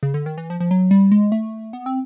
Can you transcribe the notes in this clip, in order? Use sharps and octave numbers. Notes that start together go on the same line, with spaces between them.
C#3
D3
D#3
E3
F3
F3
F#3
G3
G#3
A3
B3
C4